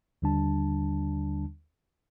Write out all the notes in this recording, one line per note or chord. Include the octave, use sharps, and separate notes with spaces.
D#2 D3 G3 D4 A5